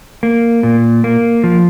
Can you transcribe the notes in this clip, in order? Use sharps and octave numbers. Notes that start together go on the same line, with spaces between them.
A#3
A#2
A#3
F3